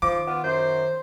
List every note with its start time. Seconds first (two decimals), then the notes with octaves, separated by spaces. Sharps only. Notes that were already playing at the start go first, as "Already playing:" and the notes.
0.02 D#3 F3 D6
0.27 B3 F4
0.44 F#2 C5